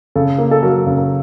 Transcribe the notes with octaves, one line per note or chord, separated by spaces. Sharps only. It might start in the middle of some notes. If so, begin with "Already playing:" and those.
C#3 A4
A#3
A4
F#3 A#4
C#3
A#4